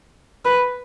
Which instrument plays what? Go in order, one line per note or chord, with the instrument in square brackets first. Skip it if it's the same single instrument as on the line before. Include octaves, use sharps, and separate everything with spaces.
[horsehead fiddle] B4